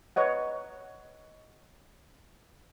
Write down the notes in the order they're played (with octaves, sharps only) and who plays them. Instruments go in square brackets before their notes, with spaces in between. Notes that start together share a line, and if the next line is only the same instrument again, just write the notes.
[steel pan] B4 C#5 D#5 F#5